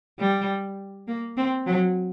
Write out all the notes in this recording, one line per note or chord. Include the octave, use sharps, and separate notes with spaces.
G3
A#3
C4
F#3